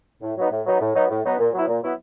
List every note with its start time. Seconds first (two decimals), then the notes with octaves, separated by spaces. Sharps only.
0.22 A2
0.36 F#3 B3 D#4
0.51 A2
0.66 F#3 B3 D#4
0.80 A2
0.95 F#3 B3 D#4
1.10 A2
1.24 F#3 B3 D#4
1.39 A#2
1.53 F#3 B3 E4
1.67 A#2
1.82 F#3 B3 E4